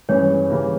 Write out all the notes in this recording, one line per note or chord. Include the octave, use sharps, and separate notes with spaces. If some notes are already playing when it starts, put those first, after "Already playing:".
G2 E3 G#3 C#4 C#5
C#3 E3 G3 A#3